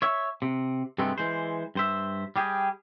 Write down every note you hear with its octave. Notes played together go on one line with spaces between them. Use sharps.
C#5 E5
C3
G2 C3 G#3 A3 B3 C4
E3 G#3 C5
G2 C5 E5
G3 G4 G#4